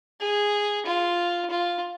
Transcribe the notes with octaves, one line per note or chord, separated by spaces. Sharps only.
G#4
F4
F4